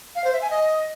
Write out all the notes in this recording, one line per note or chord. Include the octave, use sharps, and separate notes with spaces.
F5
C5
E5
G#5
D#5